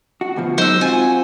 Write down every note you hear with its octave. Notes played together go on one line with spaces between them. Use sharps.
F#4
D2 B2 F3
F#3 G#3 D#4 C5 E6
C4 F4 F#4 G#5